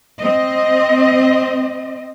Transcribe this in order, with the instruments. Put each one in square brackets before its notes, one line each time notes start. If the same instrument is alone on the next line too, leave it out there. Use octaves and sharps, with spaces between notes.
[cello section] C4 D#5